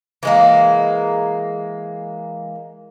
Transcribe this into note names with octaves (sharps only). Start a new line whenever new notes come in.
E3 G#3 A#3